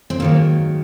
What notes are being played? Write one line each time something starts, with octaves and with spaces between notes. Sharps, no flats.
C4
G#2 D#3 F#3 A#3